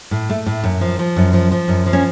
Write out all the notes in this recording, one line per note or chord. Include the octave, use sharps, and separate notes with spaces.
A2
A3
A2
F#2
F3
F3
F#2
F3
F3
F#2
F3
C#4